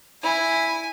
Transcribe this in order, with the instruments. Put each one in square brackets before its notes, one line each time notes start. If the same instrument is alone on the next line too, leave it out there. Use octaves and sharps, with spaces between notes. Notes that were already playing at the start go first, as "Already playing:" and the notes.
[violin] E4 [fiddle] G#5